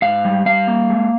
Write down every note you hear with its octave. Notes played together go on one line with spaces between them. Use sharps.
G#2 F5
G3
G3 F5
A#3
G#3